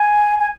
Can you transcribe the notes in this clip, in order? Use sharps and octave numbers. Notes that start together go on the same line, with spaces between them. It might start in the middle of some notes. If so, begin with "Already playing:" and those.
Already playing: G#5
G#5